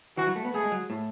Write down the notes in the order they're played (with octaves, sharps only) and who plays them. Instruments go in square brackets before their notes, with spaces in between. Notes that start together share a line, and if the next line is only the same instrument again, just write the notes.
[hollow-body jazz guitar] E3 [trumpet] F#4
[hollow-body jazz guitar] F#3
A3
B3
[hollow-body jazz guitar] A3 [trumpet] G#4
[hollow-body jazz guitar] G#3
F#3
A2